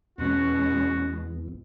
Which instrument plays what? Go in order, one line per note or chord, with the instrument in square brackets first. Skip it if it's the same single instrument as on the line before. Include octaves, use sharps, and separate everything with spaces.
[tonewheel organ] E2 [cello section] B2 G#3 [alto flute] C#4 [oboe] F#4